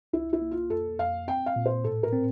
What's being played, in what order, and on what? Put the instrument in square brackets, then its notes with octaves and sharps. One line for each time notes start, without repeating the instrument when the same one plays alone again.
[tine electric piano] C2 [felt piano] E4
[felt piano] E4
[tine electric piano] A#3
[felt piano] F4
[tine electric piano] F2 [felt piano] A4
[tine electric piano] F2 [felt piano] F5
[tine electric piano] C4 [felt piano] G5
[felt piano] F5
[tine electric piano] A#2
[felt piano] C5
[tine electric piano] A2 [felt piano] A4
[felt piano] A#4
[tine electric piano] C4